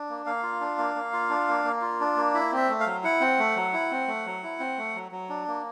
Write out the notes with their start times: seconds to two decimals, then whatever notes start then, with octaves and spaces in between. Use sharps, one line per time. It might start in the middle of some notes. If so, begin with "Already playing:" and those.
Already playing: D4
0.09 A#3
0.26 A#3 F5
0.43 F4
0.60 D4
0.78 A#3
0.95 A#3
1.13 F4
1.30 D4
1.48 A#3
1.64 A#3
1.82 F4
2.00 D4
2.16 A#3
2.34 E4 E5
2.52 C4 E5
2.69 A3
2.80 F5
2.86 F#3
3.04 E4 F#5
3.21 C4
3.39 A3
3.56 F#3
3.73 E4
3.91 C4
4.08 A3
4.26 F#3
4.43 E4
4.60 C4
4.78 A3
4.95 F#3
5.12 F#3
5.29 D4
5.47 A#3